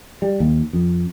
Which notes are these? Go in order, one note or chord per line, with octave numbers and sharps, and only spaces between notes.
G3
D#2
F2